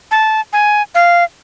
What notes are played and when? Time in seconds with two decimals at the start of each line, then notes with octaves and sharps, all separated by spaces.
0.11 A5
0.53 G#5
0.95 F5